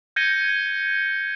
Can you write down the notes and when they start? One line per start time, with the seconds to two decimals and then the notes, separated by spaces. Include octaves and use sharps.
0.16 G6 G#6 A#6 C#7 D#7 G7